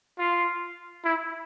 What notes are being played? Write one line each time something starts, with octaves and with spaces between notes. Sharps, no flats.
F4
E4